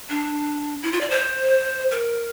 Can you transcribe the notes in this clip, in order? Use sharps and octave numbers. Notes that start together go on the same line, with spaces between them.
D4
E4
F4
D5
C5
A#4